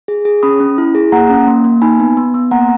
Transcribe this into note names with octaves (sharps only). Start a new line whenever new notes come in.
G#4
G#4
C#4 B5 D#6
C#4
E4
G#4
A#3 F#5 A#5
C#4
A#3
A#3
D#4 G#5 B5
B3
B3
B3
A#3 F#5 A#5